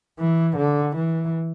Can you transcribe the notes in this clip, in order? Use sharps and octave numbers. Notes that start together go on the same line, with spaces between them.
E3
D3
E3